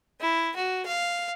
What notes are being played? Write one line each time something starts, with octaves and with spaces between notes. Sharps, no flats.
E4
F#4
F5